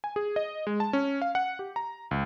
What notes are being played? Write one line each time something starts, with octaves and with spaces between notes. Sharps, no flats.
G#5
G#4
D#5
G#3
A5
C#4
F5
F#5
G4
A#5
C#2